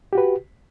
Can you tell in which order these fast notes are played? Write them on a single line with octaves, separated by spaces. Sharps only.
G4 F#4 B4